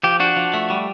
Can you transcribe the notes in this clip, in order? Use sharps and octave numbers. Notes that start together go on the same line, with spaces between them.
F3 G4
D4 F#4
F3
A3
G3